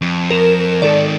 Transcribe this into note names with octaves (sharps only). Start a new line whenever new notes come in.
F2
A#4 E7
G#2 D#3 A4 D5